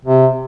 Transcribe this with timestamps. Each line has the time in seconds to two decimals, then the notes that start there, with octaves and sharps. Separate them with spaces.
0.05 C3